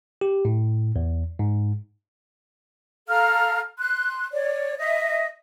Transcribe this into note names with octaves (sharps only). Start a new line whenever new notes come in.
G4
A2
E2
G#2
A4 F5 A#5 F6
C6 F#6
C#5 D5
D#5 E5